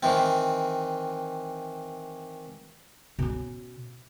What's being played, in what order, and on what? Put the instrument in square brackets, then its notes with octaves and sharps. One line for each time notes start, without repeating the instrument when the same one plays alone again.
[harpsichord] D#3 E3 C4
[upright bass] B2 C#4